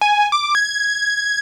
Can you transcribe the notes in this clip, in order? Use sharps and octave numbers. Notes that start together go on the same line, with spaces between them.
G#5
D6
G#6